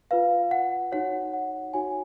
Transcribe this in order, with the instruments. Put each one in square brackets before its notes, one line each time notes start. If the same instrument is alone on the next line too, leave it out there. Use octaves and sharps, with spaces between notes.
[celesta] F4 B4 F5
F#5
D#4 F#4 C#5 F#5
F#5
D#4 F#4 C#5 G#5